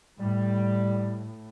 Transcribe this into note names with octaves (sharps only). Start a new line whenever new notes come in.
A2 G3